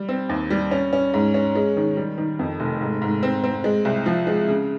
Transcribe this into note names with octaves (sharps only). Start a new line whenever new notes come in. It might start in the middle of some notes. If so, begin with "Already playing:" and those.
Already playing: G3
C4
D#2
G3
C#4
C#4
G#2
C#4
G#3
D#3
G3
D#3
F2
F1
G#2
G#2
C4
C4
G#3
C2
F3
G#3
C#3